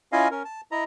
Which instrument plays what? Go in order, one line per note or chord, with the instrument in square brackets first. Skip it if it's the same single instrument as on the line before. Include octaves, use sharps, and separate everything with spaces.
[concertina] C#4 E4 F4 D#5 F5 G#5
C#4 A#4
A5
E4 D#5 A#5